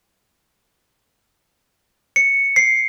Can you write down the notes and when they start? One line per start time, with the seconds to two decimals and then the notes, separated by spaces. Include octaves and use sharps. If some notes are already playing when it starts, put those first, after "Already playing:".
2.16 C#7
2.56 C7